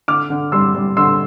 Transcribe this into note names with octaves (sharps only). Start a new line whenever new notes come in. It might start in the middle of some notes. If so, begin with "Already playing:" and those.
D3 D6 F6
D3
G3 C6 E6
G3
D3 C6 E6